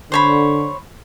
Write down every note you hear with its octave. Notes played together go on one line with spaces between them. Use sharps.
D3 C5 C#5 B5